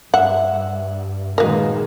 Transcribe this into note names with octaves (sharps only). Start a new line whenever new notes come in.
G2 E5 F#5
A#2 D#3 G#3 F#4 G#4 A#4 B4 F5